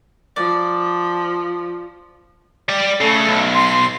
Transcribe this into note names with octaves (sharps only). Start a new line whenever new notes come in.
F3 D5
G3 D5
C#3 A3 A4
B1
C6